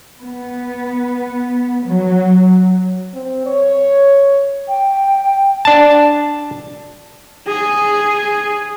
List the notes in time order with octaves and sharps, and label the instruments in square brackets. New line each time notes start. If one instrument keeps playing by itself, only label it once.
[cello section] B3
F#3
[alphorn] C4
C#5
[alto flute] G5
[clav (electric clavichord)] D4 A5
[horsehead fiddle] G#4